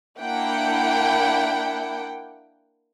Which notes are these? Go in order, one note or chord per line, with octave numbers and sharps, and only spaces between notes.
A#3 D4 E4 F#5 G5